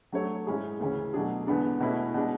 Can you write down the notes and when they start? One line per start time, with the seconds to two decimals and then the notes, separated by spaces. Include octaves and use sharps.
0.12 F#3 A3 D4 A4 C#5
0.47 G#2 G#3 C#4 E4 G#4
0.80 D2 C#3 E3 G#3 C#4
1.14 B2 F#3 A3 D4 G#4
1.47 E2 D3 G#3 B3 D4
1.80 B2 A3 C#4 E4 B4
2.14 B2 G#3 D4